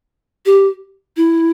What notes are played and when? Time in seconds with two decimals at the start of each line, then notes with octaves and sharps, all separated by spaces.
0.46 G4
1.17 E4